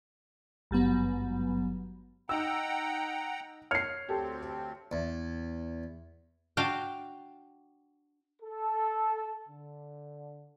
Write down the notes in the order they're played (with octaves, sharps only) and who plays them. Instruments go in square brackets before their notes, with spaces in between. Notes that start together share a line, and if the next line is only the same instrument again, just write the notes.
[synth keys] G#1 G2 F#3 B3
[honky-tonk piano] D#4 E6 [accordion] F#5 G5 A#5
[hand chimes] C#5 G#6 C#7 [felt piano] F6 C7
[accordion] D2 C4 [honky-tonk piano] G4 A4
[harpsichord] E2
[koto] D4 F#4 F5 G5 A5
[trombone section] A4
D3